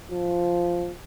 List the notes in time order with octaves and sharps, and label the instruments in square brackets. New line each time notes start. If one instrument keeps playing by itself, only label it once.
[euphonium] F3